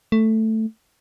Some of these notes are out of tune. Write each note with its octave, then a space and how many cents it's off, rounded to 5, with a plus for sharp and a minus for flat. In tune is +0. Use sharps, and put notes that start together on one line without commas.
A3 +5